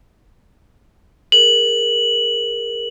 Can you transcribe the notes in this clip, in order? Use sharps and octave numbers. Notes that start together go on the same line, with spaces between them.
G#4 A#4 F#7